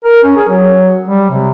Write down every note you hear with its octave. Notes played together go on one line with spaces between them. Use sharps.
A#4
C#4
G#4
F#3
G3
C3